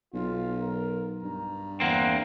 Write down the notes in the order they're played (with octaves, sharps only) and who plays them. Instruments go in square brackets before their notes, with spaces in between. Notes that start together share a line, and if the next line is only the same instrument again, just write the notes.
[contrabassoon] B1 [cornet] F4
[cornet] A#4
[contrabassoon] G2 [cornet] A#5
[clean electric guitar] E2 A#3 C4 [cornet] F#5